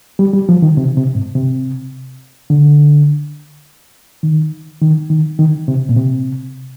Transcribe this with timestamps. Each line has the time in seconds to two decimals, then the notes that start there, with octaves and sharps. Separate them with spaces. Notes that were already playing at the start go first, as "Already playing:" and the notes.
0.19 G3
0.33 G3
0.49 F3
0.62 D#3
0.77 C3
0.97 C3
1.15 G#2
1.35 C3
2.50 D3
4.23 D#3
4.82 D#3
5.10 D#3
5.39 D#3
5.68 C3
5.89 A#2
5.96 C3